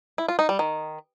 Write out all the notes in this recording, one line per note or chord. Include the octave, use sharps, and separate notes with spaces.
E4
F4
D#4
G3
D#3